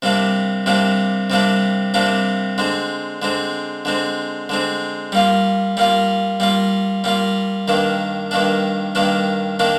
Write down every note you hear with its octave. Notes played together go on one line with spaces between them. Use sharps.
C3 G3 A#3 D4
C3 G3 A#3 D4
C3 G3 A#3 D4
C3 G3 A#3 D4
D3 G#3 C4
D3 G#3 C4
D3 G#3 C4
D3 G#3 C4
G3 A#3 F4
G3 A#3 F4
G3 A#3 F4
G3 A#3 F4
G2 D#3 A#3 D4
G2 D#3 A#3 D4
G2 D#3 A#3 D4
D#3 A#3 D4